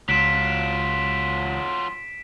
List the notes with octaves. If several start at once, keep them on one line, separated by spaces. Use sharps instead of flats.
C#2 F#3 F4 B6 D7 E7